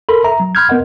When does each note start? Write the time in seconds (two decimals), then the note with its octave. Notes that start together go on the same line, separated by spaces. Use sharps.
0.09 A4 A#4 B5 C6
0.24 E5 A#5
0.40 F#3
0.55 B5 C6 F6 G6 G#6
0.69 B3 A#4 D#5 F#5